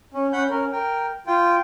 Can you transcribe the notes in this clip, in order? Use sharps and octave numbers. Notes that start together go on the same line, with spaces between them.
C#4
C#4 F#5 B5 G6
C#4 A#4
A#4 G5
F4 G5